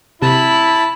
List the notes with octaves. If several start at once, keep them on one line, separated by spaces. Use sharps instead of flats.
C3 E4 A5 B5